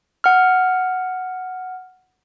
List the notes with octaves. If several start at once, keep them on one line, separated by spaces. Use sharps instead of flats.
F#5 F6